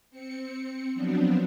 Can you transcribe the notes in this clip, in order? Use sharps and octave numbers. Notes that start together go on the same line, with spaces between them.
C4 C#7
F3 F#3 B3 C4 D4